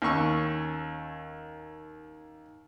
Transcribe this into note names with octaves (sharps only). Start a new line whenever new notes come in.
D#2 C#4 C#6 E6